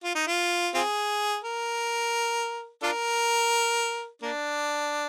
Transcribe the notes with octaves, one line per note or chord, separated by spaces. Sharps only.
F4
D#4
F4
C4 F4 G#4
A#4
D4 F4 A#4
A#3 D4